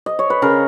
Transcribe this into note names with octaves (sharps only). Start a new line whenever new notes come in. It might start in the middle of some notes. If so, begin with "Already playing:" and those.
D#5
C#5
B4
C#3 A#4